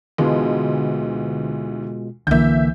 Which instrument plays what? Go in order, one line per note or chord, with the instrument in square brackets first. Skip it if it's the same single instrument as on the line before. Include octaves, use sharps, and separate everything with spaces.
[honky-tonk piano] D2 E3 [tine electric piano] B2 G#3 F4
[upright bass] C2 E3 [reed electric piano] D3 A#3 [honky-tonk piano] E5 G6